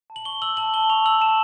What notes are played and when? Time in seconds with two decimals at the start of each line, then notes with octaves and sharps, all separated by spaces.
0.10 A5
0.16 F#7
0.25 C#6 G7
0.42 E6 F#7
0.57 A5 F#7
0.74 A5 G7
0.90 C#6 F7
1.06 E6 F#7
1.21 A5 E7